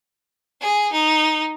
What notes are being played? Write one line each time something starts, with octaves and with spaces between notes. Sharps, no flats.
G#4
D#4